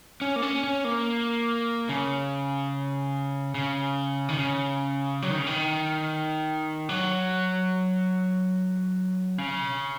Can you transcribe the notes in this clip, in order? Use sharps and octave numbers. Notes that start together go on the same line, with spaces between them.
C#4
A#3
C#4
C#4
A#3
C#3
C#3
D#3
C#3
F#3
D#3
C#3
D#3
F#3
C#3